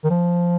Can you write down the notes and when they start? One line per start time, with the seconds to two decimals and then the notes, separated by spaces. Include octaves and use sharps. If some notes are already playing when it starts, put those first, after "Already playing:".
0.04 D#3
0.10 F3